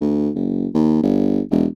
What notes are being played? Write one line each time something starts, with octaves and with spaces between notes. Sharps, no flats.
D2
F#1
D#2
G1
E1